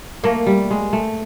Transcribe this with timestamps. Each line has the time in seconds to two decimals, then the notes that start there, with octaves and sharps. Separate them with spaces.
0.24 A3 A#3
0.46 G3
0.71 G#3
0.93 A3